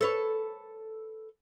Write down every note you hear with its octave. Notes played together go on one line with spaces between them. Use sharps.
A4 B4 C#5